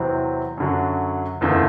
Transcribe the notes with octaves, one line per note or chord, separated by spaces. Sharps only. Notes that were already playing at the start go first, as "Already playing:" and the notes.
Already playing: E2 C3 F#3 C4 E4
F#2 D3 F#3
F#1 E2 D3 A3